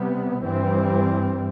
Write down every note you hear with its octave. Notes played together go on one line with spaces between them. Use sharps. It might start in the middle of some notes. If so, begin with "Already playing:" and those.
Already playing: C3 G3 B3
G2 E3 G3 C4